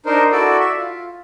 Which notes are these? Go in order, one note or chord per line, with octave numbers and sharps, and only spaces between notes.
D4 D#4 A#4 C5
E4 F#4 A4 D5
E5
F4